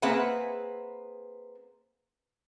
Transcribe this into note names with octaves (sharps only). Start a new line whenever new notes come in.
A#3 C4 G#4 B4 E5 F#5